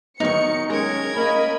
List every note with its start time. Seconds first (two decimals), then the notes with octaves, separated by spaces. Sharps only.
0.20 D#3 F#3 B3 D#4 C#6 C#7
0.70 G#3 C#4 A#4 G#6
1.15 A#3 C#4 D#5 B5